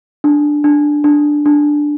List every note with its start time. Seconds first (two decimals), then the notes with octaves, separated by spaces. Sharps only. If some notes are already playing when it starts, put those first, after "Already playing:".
0.24 D4
0.64 D4
1.04 D4
1.46 D4